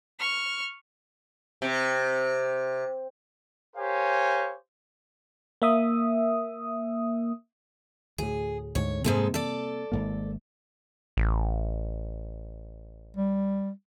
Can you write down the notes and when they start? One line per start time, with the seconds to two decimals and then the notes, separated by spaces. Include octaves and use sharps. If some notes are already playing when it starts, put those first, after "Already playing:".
0.19 C#6 F6
1.62 C3
3.76 G4 A#4 C5 C#5 F5 G#5
5.62 A#3 E5 D#6
8.18 D2 A2 G#4
8.75 D2 G#2 D3 C#5
9.04 G#2 C3 G#3 A#3 C4 A4
9.34 A4 D5
9.92 G#1 G#2 A#3
11.17 A1
13.17 G3